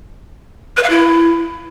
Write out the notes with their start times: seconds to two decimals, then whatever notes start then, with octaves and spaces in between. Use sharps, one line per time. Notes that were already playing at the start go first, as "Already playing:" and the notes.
0.77 B4
0.83 F5
0.90 E4